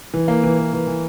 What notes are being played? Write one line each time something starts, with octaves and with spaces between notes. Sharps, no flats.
E3
A#3
E3
E3
E3
E3